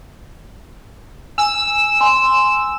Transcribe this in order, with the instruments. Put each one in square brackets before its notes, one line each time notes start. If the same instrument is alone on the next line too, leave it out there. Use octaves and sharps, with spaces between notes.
[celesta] G#5 [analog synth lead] E6
[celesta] G#5 C6